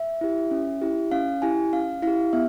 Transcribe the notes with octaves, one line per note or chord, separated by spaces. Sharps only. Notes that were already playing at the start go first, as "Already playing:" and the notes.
Already playing: E5
E4 G4
C#4
E4 G4
C#4 F5
E4 G4 G#5
C#4 F5
E4 G4 F5
B3 E5